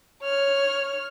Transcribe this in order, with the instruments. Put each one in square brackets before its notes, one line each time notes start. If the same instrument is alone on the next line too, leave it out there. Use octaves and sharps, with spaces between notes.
[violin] C#5 F6